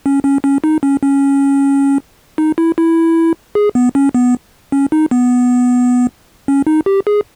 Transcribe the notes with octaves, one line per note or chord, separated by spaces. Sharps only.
C#4
C#4
C#4
D#4
C#4
C#4
D#4
E4
E4
G#4
B3
C#4
B3
C#4
D#4
B3
C#4
D#4
G4
G#4